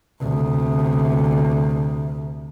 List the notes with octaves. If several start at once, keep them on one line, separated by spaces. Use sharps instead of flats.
D2 C3